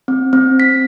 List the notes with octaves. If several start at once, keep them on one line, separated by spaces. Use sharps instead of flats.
C4
C4
B6